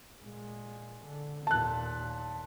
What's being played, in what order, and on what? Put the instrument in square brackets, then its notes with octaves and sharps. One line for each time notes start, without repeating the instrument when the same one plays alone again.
[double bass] A#2 G#3
D3
[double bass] D#2 A#2 [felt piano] A5 F#6